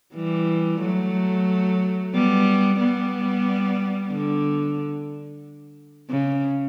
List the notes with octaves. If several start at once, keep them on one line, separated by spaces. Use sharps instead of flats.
E3 G3
F#3 A3
G3 B3
G3 B3
D3
C#3